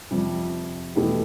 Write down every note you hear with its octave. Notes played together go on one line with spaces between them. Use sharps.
F2 C3 G3
E2 B2 A3 E4 G4